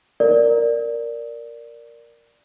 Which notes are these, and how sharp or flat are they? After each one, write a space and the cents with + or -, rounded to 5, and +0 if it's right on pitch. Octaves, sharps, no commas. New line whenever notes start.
A#4 +0 D5 +0